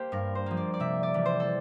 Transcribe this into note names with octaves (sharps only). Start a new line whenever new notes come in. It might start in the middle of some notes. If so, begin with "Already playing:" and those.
Already playing: A#3 G4 C5
G2 A#4
C5
F3 A#3
D5
D5
C3 E5
D5
E3 G3
C5
A4